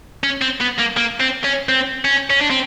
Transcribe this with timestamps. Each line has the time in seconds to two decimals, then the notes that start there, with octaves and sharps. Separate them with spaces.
0.24 C#4
0.41 C4
0.60 B3
0.78 A#3
0.97 A#3
1.20 C4
1.44 C#4
1.69 C4
2.05 C#4
2.30 C#4
2.41 D4
2.50 C4